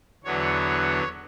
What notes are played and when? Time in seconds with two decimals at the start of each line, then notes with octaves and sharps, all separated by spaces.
0.24 E2 D3 F#3 B3 C#5